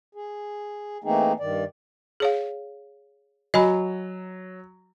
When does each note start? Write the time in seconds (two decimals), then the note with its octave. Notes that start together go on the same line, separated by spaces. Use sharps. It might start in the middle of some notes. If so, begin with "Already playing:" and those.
0.15 G#4
1.04 E3 A3 A#3 C4 D#4 G#4
1.40 G2 D#3 D5
2.20 G#4 C#5 F5
3.54 F#3 D#5 G#5 B5